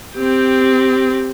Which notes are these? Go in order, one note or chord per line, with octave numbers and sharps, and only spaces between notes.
C4 G4